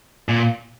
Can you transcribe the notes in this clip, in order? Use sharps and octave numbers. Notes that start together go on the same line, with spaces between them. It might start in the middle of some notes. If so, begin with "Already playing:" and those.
A#2